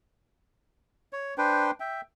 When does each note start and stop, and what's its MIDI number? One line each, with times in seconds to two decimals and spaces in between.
1.13 1.34 73
1.38 1.71 62
1.38 1.71 71
1.38 1.71 72
1.38 1.71 79
1.80 2.01 76
1.80 2.01 79